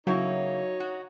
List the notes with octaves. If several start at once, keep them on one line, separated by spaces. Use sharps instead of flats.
C#3 F#3 A#3 D#4 E4 C#5
F#4